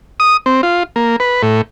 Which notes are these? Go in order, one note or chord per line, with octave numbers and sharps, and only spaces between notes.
D#6
C4
F4
A#3
B4
A2